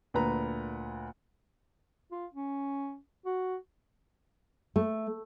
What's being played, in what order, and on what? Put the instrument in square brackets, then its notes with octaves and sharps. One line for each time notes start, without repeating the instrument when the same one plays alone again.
[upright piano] D2 A#2 B4 A#5
[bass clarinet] F4
C#4
F#4
[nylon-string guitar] A3